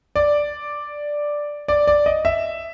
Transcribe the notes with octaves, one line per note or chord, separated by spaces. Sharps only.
D5
D5
D5
D#5
E5